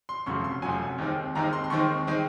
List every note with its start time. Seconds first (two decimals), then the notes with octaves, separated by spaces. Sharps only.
0.09 C6
0.26 F1 F2 C#3 F#3 C#6
0.44 C6
0.62 F1 F2 C#3 F#3 G#5
0.98 D#2 D#3 G#3 C4
1.35 D#2 D#3 G#3 C4 A#5
1.53 C6
1.64 C6
1.70 D#2 D#3 G#3 C4 C#6
2.07 D#3 G#3 C4